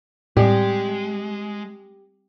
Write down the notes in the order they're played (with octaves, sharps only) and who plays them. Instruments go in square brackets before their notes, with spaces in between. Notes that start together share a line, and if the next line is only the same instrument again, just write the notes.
[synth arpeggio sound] A2 [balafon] G3 C4 D5 [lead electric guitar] G#3 [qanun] G4